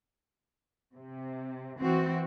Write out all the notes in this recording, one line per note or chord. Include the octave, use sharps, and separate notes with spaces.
C3
E3 C4 F#4